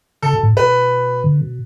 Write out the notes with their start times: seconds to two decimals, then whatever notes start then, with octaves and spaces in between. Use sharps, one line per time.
0.22 C#3 A4
0.33 B2
0.43 A2
0.54 B2 B4
1.24 D3
1.41 B2